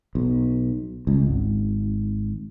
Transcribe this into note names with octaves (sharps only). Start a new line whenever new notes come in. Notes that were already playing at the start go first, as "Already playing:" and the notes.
B1
C#2
G#1